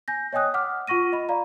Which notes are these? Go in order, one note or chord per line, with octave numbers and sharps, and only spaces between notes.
G#5 G6 A#6
C#5 D#5 G5 G#5 D#6 F#6
F#5 D6 F6
F4 F#5 C#6 A#6 D#7
D#5 B5
D5 F5 A#5